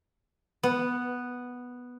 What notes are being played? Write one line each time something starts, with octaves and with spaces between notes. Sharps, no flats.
B3